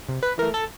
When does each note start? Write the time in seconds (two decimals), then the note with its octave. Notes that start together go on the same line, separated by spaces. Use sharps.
0.09 C3
0.23 B4
0.38 E3 A3 A#4
0.54 A4